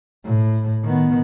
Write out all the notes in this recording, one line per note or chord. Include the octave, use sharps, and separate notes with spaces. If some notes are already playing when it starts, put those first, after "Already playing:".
A2
D#3 B3